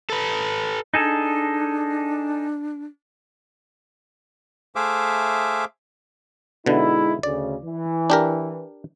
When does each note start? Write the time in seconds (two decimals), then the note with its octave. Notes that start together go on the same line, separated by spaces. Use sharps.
0.10 A4 B4
0.94 D4 D#4 G#4 A4
4.76 A3 G#4 C5 E5 F5 D6
6.66 B2 D3 G#3 D#4 E4
7.23 D2 C#3 D5
7.65 E3
8.10 D4 G4 A#4